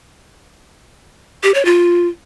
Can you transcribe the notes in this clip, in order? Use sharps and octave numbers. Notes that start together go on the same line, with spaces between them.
G4
C#5
F4